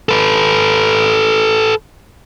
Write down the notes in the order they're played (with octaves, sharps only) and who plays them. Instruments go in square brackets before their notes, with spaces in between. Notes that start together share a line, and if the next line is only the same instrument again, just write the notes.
[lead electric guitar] A4 B4